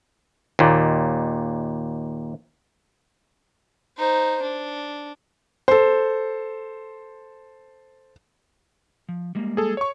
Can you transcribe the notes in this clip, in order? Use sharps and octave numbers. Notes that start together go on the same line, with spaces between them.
D#2 A#2
D#4 C5
D4
A4 C5
F3
G3 G#3 A#3
G#4 A4
C#5 C#6